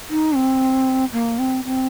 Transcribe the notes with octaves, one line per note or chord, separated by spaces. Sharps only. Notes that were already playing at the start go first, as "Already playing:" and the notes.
D#4
C4
A#3
C4
C4